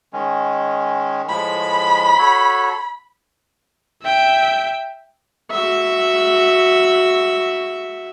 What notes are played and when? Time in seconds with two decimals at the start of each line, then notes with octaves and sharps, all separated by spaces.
0.13 D#3 G#3 C#4
1.29 A2 F3 G#3 B5
2.19 F#4 A4 C#5
4.03 E5 G5
5.51 F#4 E5